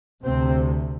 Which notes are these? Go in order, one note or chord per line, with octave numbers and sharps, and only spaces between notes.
D2 C3 C4